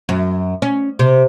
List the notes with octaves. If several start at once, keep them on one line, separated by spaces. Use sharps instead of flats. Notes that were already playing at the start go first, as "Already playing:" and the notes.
F#2
C#4
C3